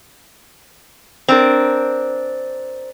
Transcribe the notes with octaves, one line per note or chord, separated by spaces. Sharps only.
C4 D4 A#4